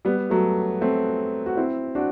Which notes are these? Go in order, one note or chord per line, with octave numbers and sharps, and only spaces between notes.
G3 B3
F#3 A3
A3 C4
F#4
C4 E4
D4 F#4